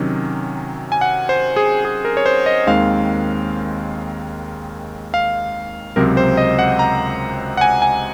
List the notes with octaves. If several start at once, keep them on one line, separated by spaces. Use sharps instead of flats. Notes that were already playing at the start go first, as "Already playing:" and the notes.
Already playing: C3 D#3 F#3 C#4
G#5
F#5
C5
G#4
G#4
A#4
C#5
C5
D#5
D#2 D#3 G#3 C4 F5
F5
C#2 C3 F#3 C4 A#4
C5
D#5
F#5
A#5
F#5
G#5
G#5